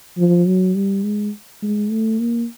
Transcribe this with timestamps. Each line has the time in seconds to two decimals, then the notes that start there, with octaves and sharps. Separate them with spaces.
0.18 F3
0.47 F#3
0.75 G3
1.04 G#3
1.63 G#3
1.91 A3
2.19 A#3